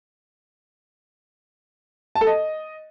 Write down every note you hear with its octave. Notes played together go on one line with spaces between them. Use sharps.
A5
A4
D#5